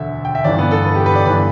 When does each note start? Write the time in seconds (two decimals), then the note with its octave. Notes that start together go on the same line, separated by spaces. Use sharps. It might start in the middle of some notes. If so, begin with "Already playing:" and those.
Already playing: E1 D2 D3 E5
0.25 G5
0.35 E5
0.44 G1 G2 E3 D5
0.58 B3
0.71 A4
0.84 B4
0.95 G4
1.06 B4
1.15 D5
1.25 G1 G2 E3 B4